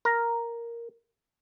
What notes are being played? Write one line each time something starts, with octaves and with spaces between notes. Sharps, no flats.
A#4